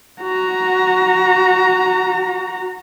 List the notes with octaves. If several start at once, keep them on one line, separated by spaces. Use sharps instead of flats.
F#4 A#5